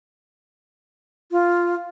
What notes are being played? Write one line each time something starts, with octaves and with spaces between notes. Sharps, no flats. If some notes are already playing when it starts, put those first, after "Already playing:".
F4